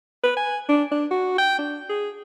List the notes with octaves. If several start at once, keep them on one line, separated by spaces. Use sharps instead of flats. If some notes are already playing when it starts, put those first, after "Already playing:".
B4
G#5
D4
D4
F#4
G5
D4
G#4